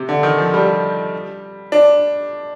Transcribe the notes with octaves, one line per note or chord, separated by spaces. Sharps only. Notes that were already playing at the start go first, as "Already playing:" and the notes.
Already playing: C3
D3
D#3
F3
G3
D4